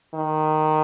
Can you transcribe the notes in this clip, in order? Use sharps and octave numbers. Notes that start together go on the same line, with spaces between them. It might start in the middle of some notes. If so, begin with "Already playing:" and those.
D#3